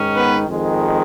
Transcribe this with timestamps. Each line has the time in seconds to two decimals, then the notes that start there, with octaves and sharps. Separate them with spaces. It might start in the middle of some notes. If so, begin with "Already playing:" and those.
Already playing: G#2 D#3 C#4
0.15 B3 B4
0.49 F2 D#3 G#3